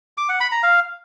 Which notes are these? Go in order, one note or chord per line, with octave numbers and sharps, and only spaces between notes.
D6
F#5
B5
A#5
F5